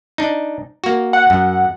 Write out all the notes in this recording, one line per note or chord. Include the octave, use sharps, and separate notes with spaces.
D4 D#4
A#3 F#4
F#5
F#2